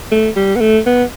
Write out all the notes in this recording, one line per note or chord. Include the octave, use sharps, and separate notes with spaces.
A3
G3
B3
A3
B3